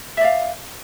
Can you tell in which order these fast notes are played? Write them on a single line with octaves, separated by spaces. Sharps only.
E5 D5 F5